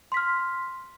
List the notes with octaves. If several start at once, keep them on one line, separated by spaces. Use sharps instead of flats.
C6 F6 B6